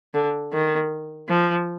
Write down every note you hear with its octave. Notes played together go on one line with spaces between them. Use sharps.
D3
D#3
F3